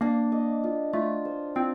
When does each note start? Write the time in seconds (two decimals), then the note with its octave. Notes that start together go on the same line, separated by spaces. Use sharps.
0.01 A#3 D4
0.32 D#5
0.64 F4
0.93 A3 F4
1.25 C5
1.55 C4 F4